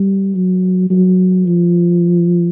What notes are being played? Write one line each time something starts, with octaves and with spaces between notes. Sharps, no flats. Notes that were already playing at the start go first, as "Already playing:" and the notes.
Already playing: G3
F#3
F#3
F3